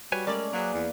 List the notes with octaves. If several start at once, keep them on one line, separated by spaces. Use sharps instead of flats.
G3 F#4 B4 C#5 G#5
G#3 A3 C#4 A#4 D5
F#3 A#3 G#4 B4
E2